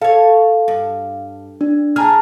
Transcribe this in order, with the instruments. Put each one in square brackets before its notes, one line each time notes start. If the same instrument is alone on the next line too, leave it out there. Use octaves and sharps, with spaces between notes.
[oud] A4 C#5 [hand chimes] F5
[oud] G2
[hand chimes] D4
[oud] G#4 [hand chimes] A5 A#5 F6